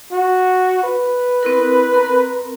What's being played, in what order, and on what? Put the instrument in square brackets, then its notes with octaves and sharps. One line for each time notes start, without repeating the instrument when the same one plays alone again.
[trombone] F#4
B4
[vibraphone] C4 E4 A#4
C4 A#4 A#5